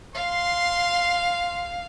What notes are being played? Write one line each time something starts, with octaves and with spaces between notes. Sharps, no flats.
F5 C6